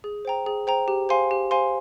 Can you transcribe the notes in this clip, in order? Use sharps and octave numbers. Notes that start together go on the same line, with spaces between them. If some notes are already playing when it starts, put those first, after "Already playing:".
G#4
C5 G5 A#5
G#4
C5 G5 A#5
G4
C5 F5 G#5 C6
G4
C5 F5 G#5 C6